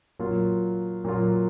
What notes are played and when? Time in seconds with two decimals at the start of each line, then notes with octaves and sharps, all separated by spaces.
0.19 A#2 F#3 A#3 F4
1.04 A#2 F#3 A#3 F4